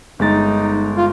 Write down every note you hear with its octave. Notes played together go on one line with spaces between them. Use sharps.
G1 G#3 D#4 A6
F4